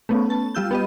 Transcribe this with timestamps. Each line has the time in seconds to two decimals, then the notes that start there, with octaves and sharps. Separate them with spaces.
0.09 A3 B3 C#4
0.30 A5
0.55 G3 F4 E6 G6
0.71 B3 G4 D#5